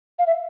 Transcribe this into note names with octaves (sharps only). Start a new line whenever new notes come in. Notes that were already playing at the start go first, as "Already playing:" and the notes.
F5
E5